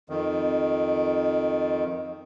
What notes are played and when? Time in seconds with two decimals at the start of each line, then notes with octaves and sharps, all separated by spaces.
0.10 F2 D#3